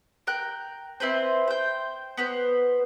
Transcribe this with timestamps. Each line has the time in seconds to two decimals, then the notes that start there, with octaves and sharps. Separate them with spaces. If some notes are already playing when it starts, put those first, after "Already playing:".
0.27 A#4 G5 F#6
1.00 C4 E4 B4 C5
1.48 C5 G5
2.17 B3 B4 C5